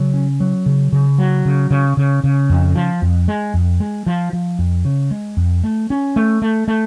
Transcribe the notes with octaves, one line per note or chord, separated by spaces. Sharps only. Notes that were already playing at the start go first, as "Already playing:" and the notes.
Already playing: C#3 F#3
C#4
F#3
C#3
C#3
F#3
C#3
C#3
C#3
C#3
F2
F3
F2
G#3
F2
G#3
F3
F3
F2
C#3
G#3
F2
A3
C#4
A3
A3
A3